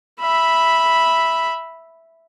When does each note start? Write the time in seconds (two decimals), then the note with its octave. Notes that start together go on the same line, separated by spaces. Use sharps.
0.20 E5 B5